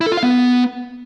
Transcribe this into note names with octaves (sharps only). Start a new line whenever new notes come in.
E4
A4
F4
F5
B3